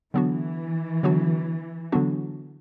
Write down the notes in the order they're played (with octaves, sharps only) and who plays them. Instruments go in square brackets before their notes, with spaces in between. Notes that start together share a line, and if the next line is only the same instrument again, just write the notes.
[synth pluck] D3 F#3 B3 D4 F#4 [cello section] E3
[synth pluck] D3 F#3 B3 D4 F#4
D3 F#3 B3 D4 F#4